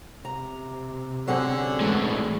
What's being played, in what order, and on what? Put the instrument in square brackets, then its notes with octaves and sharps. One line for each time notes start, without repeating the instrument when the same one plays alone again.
[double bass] C3 [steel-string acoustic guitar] A#5
[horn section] F#2 D3 [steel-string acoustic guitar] F#3 C4 G#4
[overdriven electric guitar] A2 G#3 [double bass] E3